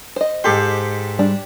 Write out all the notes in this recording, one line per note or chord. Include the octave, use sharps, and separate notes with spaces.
C5 D#5
G#2 G4 A4 C6
G3 D4